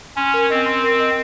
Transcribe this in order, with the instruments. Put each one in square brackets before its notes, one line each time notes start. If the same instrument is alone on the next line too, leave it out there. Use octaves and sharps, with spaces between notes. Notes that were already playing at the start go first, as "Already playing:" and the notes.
[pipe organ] C#4 [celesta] C6
[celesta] A#4
[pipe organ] C4 [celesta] D#5
[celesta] C6
A#4
D#5